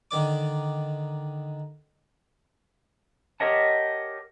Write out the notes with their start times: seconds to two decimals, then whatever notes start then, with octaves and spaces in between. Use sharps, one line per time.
0.11 D3 D#3 D5 D6
3.40 G4 A#4 C#5 D#5 F#5 A5